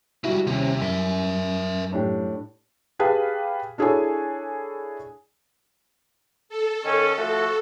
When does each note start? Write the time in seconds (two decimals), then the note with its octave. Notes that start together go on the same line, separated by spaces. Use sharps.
0.24 C#2 G3 E4 F#4
0.47 D#2 C3 C4 C#4
0.81 F#2 A#4 E5
1.92 A2 D4 G4
2.99 G4 G#4 B4 F5 G5 A5
3.78 D4 E4 G#4 A4 C#5 G#5
6.49 A4
6.84 D#3 C#4
7.18 F3 A3 F#4